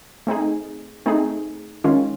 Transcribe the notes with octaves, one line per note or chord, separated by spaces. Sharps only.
A3 C4 D#4 G#4
A3 C4 D#4 G#4
D#3 G#3 C#4 F4